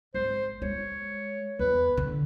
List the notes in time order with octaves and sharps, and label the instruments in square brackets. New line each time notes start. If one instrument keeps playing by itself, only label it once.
[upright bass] G#1 [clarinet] C5
[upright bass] G#3 [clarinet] C#5
[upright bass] E2 [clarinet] B4
[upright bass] D3